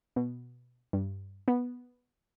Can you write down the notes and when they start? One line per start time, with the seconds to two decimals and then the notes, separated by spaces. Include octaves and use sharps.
0.16 B2
0.93 G2
1.48 B3